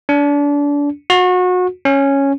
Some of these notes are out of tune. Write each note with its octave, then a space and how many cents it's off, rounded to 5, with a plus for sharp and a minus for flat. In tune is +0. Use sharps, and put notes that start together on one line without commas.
D4 -30
F#4 -30
C#4 -5